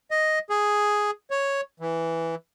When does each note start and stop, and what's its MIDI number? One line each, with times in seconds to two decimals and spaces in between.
0.11 0.39 75
0.50 1.11 68
1.30 1.61 73
1.80 2.35 52